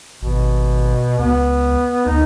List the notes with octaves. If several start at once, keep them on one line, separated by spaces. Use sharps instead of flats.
G#1 B2
C#2 B3
D2 D#4